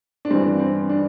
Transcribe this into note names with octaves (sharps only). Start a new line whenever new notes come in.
D4
G2 E3 C4
C4
D4